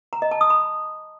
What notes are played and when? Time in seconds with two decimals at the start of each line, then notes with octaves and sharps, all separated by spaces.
0.13 A#5
0.22 D#5
0.31 A5
0.41 D#6
0.50 B5